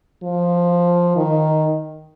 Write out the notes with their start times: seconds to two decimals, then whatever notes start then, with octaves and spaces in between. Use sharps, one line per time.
0.23 F3
1.16 D#3